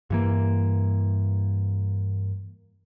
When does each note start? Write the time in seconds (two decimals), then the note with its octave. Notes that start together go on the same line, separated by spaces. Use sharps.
0.10 G2 E3 A#3